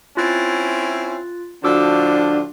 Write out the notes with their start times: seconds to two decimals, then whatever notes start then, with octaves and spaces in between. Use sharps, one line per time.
0.17 C4 C#4 E4 F4 F#6 A6
1.64 A2 D3 F3 D4 F#4 D6 E6